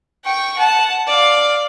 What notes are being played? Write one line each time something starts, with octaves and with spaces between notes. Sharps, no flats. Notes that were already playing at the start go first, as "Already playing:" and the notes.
G5 C#6
F#5 A5
D5 F5